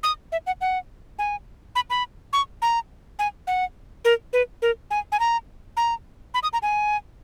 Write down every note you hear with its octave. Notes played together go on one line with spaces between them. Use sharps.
D#6
E5
F#5
F#5
G#5
B5
B5
C#6
A#5
G#5
F#5
A#4
B4
A#4
G#5
G#5
A#5
A#5
B5
D#6
A#5
G#5